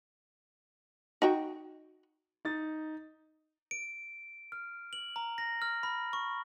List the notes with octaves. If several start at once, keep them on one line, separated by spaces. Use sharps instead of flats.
D#4 F#4 G5
D#4 A6
D7
F6
F#7
A#5
A#6
F6
B5
C#6